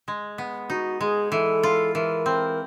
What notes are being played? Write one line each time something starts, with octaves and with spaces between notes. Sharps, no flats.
G#3
B3
D#4 F#4
G#3 G#4
E3 A4
F4
E3 A#4
C4